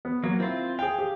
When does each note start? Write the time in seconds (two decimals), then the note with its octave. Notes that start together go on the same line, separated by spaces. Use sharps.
0.05 B3
0.24 F#3 A#3
0.40 C4 E4 F4
0.79 G#4 F5 G5
0.99 G4